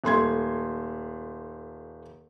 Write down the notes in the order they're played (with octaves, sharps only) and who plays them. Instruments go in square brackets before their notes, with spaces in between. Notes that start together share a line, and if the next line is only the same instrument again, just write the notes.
[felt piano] D#1 A3 C6 G#6